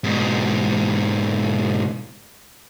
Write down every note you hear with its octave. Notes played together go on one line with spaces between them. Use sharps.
G#2 B2